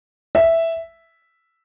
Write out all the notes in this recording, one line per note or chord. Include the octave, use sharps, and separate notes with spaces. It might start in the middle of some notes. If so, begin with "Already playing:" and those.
E5